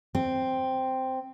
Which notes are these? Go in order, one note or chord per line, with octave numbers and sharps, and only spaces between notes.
C4